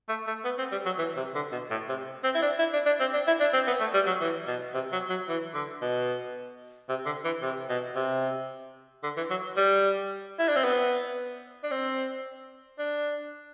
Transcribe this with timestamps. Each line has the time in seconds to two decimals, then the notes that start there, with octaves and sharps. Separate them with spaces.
0.09 A3
0.27 A3
0.45 B3
0.59 C4
0.72 G3
0.85 F#3
0.98 E3
1.17 C3
1.35 D3
1.52 B2
1.71 A2
1.89 C3
2.24 C4
2.35 E4
2.42 D4
2.59 E4
2.73 D4
2.86 D4
3.00 C4
3.14 D4
3.27 E4
3.40 D4
3.53 C4
3.67 B3
3.80 A3
3.94 G3
4.06 F#3
4.21 E3
4.47 B2
4.74 C3
4.92 F#3
5.09 F#3
5.28 E3
5.54 D3
5.82 B2
6.89 C3
7.06 D3
7.25 E3
7.43 C3
7.69 B2
7.96 C3
9.03 D3
9.17 E3
9.30 F#3
9.57 G3
10.39 E4
10.48 D4
10.56 C4
10.64 B3
11.64 D4
11.71 C4
12.79 D4